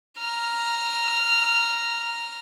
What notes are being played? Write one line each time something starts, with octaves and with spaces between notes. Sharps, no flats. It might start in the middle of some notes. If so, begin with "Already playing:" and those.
A#5 F6